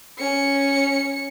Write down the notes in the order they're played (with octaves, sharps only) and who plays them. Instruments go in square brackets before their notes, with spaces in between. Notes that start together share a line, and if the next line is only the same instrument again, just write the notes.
[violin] C#4 C#7